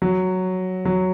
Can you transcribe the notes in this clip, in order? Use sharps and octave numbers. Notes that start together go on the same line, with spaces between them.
F#3
F#3